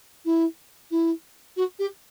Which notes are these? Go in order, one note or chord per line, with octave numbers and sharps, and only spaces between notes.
E4
E4
F#4
G4